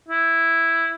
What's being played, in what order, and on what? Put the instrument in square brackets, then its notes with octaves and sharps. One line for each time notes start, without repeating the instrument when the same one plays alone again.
[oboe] E4